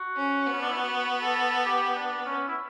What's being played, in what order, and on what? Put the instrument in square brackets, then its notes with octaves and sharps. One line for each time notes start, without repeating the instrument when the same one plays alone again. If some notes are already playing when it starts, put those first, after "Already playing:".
Already playing: [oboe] F#4
[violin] C#4
B3
[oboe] C#4
D4
E4
F#4
A4
G4
D4
C#4
E4